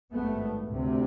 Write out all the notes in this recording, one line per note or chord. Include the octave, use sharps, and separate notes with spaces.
G#1 G2 A3 B3
D2 C3